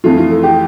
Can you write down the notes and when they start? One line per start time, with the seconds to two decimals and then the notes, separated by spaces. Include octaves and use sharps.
0.04 F2 E3 A3 F4
0.18 F4
0.31 A4
0.43 G4